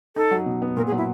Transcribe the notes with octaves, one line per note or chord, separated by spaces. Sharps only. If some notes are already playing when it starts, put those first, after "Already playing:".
D#4 A4
F#3
B2
B3
A#2 A#4
G#4
F#3
E4